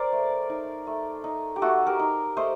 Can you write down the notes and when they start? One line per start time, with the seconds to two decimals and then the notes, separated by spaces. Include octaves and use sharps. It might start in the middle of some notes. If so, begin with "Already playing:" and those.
Already playing: A#4 C5 D5
0.12 A3
0.50 D#4
0.87 A3
1.24 D#4
1.56 G4
1.62 A3 F#4 A4
1.87 G4 A#4
1.99 D#4
2.37 A3 C5 D#5